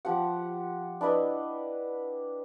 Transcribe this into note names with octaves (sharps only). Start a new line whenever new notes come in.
F3 G4 F#5
D4 E4 B4 D#5